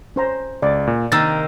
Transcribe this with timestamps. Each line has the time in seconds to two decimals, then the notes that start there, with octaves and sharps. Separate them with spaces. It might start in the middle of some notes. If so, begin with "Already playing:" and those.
0.16 C#4 C5 A#5
0.62 C#2 D5
0.87 A#2
1.12 C3 D#3 A#3 A#5 E6 A6